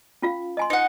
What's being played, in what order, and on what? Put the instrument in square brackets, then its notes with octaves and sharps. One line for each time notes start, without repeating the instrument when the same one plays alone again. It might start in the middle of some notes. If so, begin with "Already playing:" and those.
[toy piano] C#4 F4 F5
D#5 G#5 C6
[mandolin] D#4 F#5